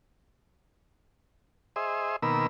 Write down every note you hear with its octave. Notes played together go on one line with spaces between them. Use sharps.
G#4 C5 D#5 E5
B2 D#3 A#3 A#4 B5 E6